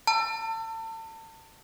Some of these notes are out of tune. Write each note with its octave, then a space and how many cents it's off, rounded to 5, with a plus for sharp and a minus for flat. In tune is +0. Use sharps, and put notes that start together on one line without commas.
A5 +35 E6 +30